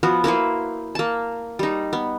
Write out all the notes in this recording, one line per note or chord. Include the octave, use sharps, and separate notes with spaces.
F3 B3 F#4
A#3 E4 B4 C5
A#3 A5
G3 D#4
B3